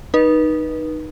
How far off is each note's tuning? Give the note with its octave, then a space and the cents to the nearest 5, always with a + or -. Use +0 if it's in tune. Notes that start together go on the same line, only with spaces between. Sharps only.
D#4 -10 B4 -30